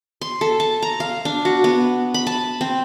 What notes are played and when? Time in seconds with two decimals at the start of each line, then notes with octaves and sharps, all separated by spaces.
0.21 C6
0.41 A4
0.60 A5
0.82 A#5
1.00 F5
1.25 D4
1.45 F#4
1.64 B3
2.14 B5
2.27 A5
2.61 C4